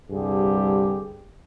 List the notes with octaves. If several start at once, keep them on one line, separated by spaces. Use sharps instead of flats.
C2 G2 D3 G4 G#4